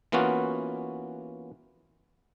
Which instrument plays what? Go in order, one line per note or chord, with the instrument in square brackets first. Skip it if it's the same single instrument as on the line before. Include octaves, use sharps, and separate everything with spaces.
[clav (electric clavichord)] E3 A#3 B3 C#4 F4 F#4